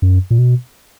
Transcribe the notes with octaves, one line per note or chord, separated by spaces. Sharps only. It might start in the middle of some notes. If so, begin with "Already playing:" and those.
F#2
A#2
B2